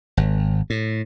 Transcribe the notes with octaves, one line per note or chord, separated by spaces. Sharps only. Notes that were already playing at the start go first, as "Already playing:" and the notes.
G#1
A2